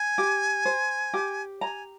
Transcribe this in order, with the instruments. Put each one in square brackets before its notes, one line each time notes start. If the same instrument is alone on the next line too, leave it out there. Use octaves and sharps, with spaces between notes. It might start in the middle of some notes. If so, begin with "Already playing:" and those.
Already playing: [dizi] G#5
[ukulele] G4
C5
G4
[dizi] G#5 [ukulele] A#5